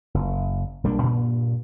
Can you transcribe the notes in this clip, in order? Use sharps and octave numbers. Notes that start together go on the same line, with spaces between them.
F#1
B1 G3 A#3 D4
G2 A#2